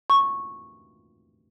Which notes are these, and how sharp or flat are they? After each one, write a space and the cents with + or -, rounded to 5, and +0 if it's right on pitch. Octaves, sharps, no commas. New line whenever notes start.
C#6 -10